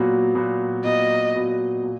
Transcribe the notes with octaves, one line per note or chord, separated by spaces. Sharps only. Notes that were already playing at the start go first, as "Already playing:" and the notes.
Already playing: A#2 F#3 B3 F#4
A#2 F#3 B3 F#4
A#2 F#3 B3 F#4 D#5
A#2 F#3 B3 F#4
A#2